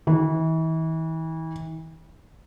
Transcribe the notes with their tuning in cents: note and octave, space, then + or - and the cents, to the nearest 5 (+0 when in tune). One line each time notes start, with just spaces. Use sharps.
E3 -40